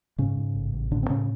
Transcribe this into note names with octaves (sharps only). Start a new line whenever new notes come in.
G#2 C#3 C#4
G#2
A1
A1
A2 D3 D4
C4
A2 C#3 C#4